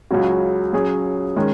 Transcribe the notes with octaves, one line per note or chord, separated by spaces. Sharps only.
C#2 C#3 F#3 C#4 F#4
F#3 C#4 G#4 C#5
D#3 G#3 C#4